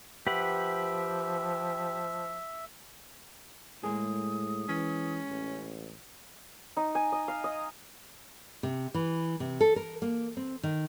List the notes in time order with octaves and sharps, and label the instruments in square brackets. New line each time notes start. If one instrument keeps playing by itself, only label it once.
[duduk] F3 [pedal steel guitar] G4 B4 F#5 [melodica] E5
[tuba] A2 [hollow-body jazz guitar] G#3 A#3 G#4 [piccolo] D#6
[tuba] E3 [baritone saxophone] C#4
[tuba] A1
[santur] D#4
G#5
D#5
F5
D#5
[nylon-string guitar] C3
E3
C3
A4
A#4
A#3
C4
D#3